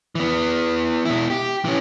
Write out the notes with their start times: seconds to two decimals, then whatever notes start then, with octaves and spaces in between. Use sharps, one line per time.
0.15 E3 B3
1.05 B2 E4
1.30 G4
1.65 E3 C#4